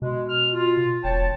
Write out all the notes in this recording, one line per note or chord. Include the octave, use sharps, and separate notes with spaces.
B2 G#3
F6
F4
E1 C#5 G5 A5